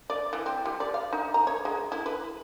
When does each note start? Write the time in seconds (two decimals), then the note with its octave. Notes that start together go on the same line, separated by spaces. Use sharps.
0.10 D5
0.33 E3
0.46 C4
0.65 G3
0.80 D5
0.94 F5
1.13 D#4
1.34 A#5
1.47 C#5
1.65 G#3
1.92 E4
2.06 B4